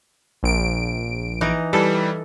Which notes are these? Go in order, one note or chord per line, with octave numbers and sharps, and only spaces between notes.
A#1 D7
E3 D#4
E3 G3 A4